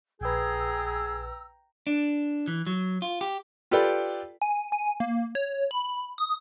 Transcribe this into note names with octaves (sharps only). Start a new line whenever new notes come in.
A#1 G#4 B4 G5 A#5 E6
D4
E3
F#3
F4
G4
F4 G4 A4 B4 D5 G5
G#5
G#5
A#3
C#5
B5
D#6